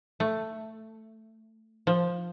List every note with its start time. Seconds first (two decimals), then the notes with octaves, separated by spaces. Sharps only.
0.20 A3
1.87 F3